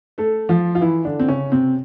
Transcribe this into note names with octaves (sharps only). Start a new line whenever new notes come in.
A3 A4
F3 F4
F4
E3 E4
D3 D4
C4
C#3 C#4
C3 C4